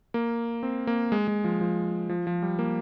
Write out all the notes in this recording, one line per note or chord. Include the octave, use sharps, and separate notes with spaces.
A#3
C4
A#3
G#3
G#3
F3
F3
F3
F3
G3
A#3